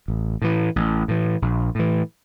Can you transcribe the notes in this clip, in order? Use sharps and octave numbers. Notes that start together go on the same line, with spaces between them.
A1
A2 E3
A1
A2 E3
A#1
A2 E3